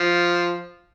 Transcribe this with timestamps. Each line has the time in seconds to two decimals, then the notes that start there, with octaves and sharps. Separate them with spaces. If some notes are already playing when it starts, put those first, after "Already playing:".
Already playing: F3